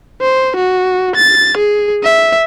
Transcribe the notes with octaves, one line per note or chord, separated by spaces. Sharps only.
C5
F#4
A6
G#4
E5